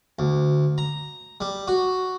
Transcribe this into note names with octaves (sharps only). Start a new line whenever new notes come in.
D2
A#5
G3
F#4